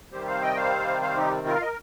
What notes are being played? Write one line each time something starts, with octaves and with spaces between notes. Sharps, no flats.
C3 D#3 G3 C4 G4 C5
C5 F5
D#5 G5
C5 F5
C5 F5
D#4 G4
F4 A#4
F5
A#4 D#5